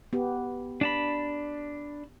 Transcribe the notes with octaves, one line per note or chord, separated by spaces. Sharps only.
B3 G4
D4 A5 B5